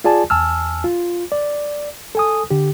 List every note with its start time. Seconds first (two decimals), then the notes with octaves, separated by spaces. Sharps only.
0.04 F4 G#4 D5 G#5 A5
0.30 E2 G#5 A5 E6 F6
0.84 F4
1.32 D5
2.15 A4 G#5 D#6
2.51 D3 G4